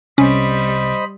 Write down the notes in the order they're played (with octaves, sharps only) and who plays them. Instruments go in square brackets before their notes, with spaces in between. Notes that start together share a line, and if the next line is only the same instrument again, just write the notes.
[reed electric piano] C2 C3 [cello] G3 [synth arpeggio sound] C#4 [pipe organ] C5 D#5 B5